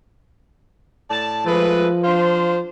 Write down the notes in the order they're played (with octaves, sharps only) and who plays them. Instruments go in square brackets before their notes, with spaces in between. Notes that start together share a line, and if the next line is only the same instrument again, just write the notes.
[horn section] A2 D5 A5
[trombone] F3 [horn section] G#3 A3 B4
[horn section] D4 F4 C5